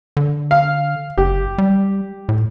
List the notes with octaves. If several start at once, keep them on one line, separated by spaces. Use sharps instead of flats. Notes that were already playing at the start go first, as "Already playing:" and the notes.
D3
F5
F#1 G4
G3
A2